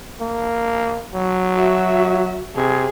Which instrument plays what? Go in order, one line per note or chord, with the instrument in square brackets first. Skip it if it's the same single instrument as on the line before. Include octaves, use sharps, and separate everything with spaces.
[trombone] A#3
F#3
[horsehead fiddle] F#4 E5
[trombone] C3 [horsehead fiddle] G#4